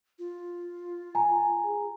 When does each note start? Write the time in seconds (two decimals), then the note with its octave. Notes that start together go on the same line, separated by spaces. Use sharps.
0.19 F4
1.15 G#5 A#5
1.63 G#4